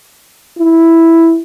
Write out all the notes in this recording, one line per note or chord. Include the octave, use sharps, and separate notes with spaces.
E4